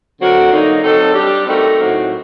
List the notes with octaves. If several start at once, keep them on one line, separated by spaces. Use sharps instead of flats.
D3 F#3 C4 F#4 A#4
D3 F#3 A#3 D#4
F#3 C4 D#4 A4
G3 D4 G4
A3 C4 D#4 F#4 A#4
A2 F#3 C4 D#4 F#4